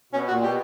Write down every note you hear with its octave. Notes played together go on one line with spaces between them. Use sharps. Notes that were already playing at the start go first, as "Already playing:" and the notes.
B2 C#4
A#2 F#4
B2 G4